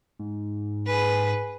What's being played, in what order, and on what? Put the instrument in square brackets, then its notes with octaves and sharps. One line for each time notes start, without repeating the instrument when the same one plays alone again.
[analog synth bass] G#2
[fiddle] G#4 B4